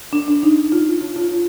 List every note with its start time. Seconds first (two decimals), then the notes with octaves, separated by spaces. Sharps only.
0.13 D4
0.28 D4
0.43 D#4
0.72 F4
1.01 F4
1.16 F4
1.31 F4